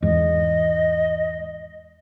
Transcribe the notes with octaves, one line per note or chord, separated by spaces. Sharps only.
E2 G#2 D#5